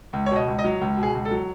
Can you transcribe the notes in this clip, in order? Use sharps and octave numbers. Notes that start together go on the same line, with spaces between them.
C#2
C#5
B2 D#5
C#2
D#5
F#3
C#2
B2
G#4
C#2
A4
F#3